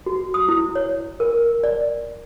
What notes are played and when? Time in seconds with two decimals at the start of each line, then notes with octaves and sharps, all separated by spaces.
0.06 F#4
0.34 D#6
0.49 E4
0.75 C#5
1.20 A#4
1.64 D5